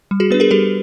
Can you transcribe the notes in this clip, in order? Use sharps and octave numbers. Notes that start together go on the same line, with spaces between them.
G3
F#4 G#4
B3 D4 B4
G#4 A#4
G3 G4 A4